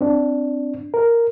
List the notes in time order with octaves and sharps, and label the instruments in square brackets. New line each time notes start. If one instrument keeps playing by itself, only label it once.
[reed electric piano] C4 D4
A#4